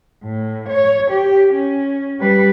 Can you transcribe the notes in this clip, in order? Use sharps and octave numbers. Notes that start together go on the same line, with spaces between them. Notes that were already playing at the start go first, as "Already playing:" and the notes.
A2
C#5
G4
C#4
G3 B4